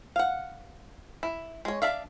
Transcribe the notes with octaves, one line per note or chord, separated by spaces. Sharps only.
F5 F#5
E4
G#3 C#5
D4 D5 E5 F5